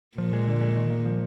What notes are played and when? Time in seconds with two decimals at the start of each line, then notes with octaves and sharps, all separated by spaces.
0.17 A#2 F3
0.33 G#3
0.47 D3
0.61 G#3
0.76 D#3
0.90 A#3
1.05 F3